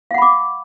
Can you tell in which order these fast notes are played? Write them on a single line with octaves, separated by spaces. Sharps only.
F5 F#5 B5 D6